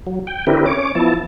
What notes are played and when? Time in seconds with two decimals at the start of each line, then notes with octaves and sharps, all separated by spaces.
0.06 F#3
0.27 G5
0.47 D3 C4 E4 G4 A#4 B4
0.66 C#4 C#5 D6
0.95 F3 B3 E4 A5